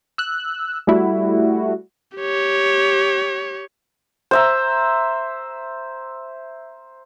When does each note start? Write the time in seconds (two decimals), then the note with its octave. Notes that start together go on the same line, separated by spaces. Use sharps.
0.18 E6 F#6
0.87 G3 A3 E4 F#4
2.17 G4 C#5
4.31 C5 E5 A#5